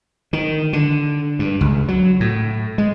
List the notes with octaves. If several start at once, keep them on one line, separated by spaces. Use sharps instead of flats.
D#3
D3
G2
C#2
F#3
A2
G#3